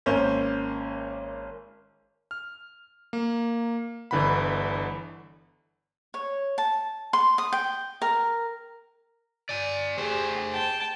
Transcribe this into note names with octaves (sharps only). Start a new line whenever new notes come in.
G#1 A#3 C#4 C5 G6
F6
A#3
G1 D3 E3 F#5 B5
C#5
A5
C6
D#6
G5
A#4
D5 G#5
A3 G4 G#4 C5
G5 A5